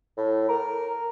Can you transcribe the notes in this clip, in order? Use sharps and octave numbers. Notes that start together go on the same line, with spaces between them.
A2
A#4